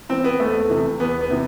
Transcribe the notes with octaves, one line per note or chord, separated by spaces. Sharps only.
E3 C4
B3
E2 A3
C3 E3
E2 B3
B3
C3 E3